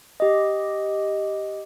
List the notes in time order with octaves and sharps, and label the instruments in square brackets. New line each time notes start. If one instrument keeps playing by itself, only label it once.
[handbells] G4 D#5